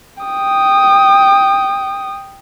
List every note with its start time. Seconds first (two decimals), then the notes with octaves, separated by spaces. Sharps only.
0.23 G5 D#6